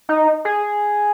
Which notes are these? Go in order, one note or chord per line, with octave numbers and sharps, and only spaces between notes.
D#4
G#4